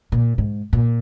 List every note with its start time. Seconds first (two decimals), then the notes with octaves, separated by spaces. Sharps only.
0.12 A#2
0.38 G#2
0.73 A#2